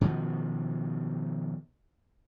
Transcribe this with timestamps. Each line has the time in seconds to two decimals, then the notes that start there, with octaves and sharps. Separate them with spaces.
0.01 B2 D#3 F3